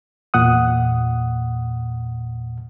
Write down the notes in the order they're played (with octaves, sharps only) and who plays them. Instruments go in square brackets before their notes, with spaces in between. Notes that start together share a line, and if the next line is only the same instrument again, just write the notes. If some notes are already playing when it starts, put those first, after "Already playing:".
[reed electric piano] E2 A#2 F#5 D#6